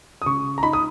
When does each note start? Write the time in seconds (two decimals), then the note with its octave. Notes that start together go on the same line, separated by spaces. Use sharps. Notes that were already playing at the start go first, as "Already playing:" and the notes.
0.22 D#6
0.26 C#3 C#6
0.58 A#5
0.63 D#4 B5
0.73 D#6